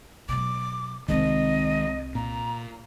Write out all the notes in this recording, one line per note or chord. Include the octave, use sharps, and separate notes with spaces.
B2 F#3 D6
C2 D#3 G#3 C4 D#5
A#2 A#5